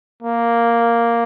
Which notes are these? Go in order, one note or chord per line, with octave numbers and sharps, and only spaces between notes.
A#3